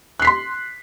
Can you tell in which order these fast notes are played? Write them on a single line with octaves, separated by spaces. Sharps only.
F#6 C7 B6 C6